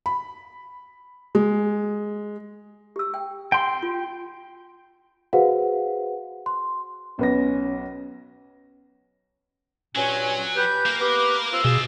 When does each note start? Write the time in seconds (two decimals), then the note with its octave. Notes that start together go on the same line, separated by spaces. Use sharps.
0.06 B5
1.35 G#3
2.96 G4 E6
3.14 G5
3.52 G5 G#5 C6
3.83 F4
5.33 F#4 G#4 B4 C5 F5 F#5
6.46 C6
7.19 B1 C#4 B4 A#6
9.96 G2 A#2 F#3 C#4 G#5
10.57 G4 B4 G6
10.86 A#3 A#4
11.00 B3 G4 B4 D6
11.53 C4 F4 F5 E6
11.64 B2 D#4 G#4 F5 A5